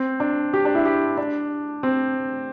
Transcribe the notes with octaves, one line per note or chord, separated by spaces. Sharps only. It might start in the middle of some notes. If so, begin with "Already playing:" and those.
Already playing: C4
D4
G4
D4
E4
G4
D4
C4